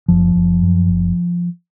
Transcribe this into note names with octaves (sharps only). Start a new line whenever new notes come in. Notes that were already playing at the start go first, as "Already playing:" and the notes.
F#1 F3
F#1
F#2
F#1